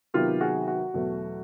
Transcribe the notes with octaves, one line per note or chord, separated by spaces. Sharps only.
C3 D#3 F#3 B3 F4 G4
F#4 G#4
F#4
E2 B2 F#3 A3